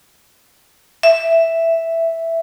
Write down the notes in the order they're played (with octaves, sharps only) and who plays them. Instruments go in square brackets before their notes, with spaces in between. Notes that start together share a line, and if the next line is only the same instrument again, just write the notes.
[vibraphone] E5